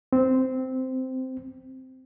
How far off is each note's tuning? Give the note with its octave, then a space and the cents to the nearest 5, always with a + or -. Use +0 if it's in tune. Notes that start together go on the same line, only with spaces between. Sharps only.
C4 -10